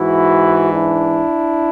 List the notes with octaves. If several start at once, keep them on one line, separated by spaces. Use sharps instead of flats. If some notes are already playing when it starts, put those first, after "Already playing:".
Already playing: G#2 E3 E4 F#4
D4 E4